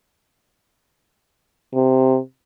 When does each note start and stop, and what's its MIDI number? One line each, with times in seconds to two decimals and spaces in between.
1.74 2.18 48